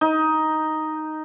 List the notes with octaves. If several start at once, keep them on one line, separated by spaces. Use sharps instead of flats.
D#4